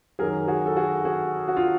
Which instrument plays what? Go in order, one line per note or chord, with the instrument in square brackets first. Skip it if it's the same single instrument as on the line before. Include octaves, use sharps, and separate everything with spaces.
[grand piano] F#2 D#3 F#3 G#4 A#4
F#4 G#4
A4
F#4 G#4
F#4 G#4
F#4
F4